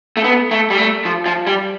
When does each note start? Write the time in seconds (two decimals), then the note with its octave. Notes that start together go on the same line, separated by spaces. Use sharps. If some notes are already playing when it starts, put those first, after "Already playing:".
0.17 A3
0.24 B3
0.51 A3
0.70 G3
0.78 A3
1.05 F3
1.26 F3
1.47 G3